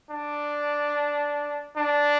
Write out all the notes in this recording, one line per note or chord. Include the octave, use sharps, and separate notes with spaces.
D4
D4